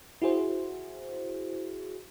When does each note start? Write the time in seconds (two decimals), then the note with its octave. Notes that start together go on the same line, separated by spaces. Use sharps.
0.22 E4 F#4 G#4 C5